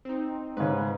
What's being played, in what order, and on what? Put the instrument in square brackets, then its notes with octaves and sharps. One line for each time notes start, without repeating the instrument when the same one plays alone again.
[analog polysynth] C4 D#4
[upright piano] G#2 C#3 [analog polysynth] B4